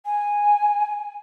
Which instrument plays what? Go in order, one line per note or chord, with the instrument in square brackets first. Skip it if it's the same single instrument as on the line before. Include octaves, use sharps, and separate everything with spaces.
[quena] G#5